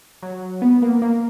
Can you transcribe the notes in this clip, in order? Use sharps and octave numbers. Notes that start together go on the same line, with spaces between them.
F#3
B3
A#3
A#3